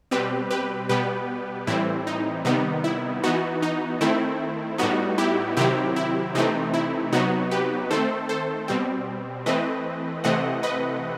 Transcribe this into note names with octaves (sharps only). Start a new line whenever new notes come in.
B2 G3 C4 G4 B4
G4 B4
B2 G3 B3 G4 B4
A2 E3 G3 C4 E4
D#4
C3 D#3 G3 B3 D#4
E4
E3 B3 D#4 F#4
D#4
D#3 A3 C4 E4
A2 G3 B3 D#4 F#4
E4 G4
C3 D#3 F#3 C4 E4 G4
E4
C3 E3 A3 C4 D#4
E4
C3 F#3 B3 D#4 F#4
G4 B4
D#3 A3 C4 A4 C5
A4 C5
B2 G3 C4
E3 A3 C4 B4 D#5
C3 E3 A3 C4 D#5 F#5
B4 D#5